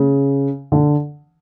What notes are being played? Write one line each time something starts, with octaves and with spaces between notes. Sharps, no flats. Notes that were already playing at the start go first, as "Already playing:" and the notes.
Already playing: C#3
D3